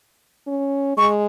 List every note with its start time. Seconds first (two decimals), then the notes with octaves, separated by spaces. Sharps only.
0.47 C#4
0.97 G#3 C#6